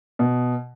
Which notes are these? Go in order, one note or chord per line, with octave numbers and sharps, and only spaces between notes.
B2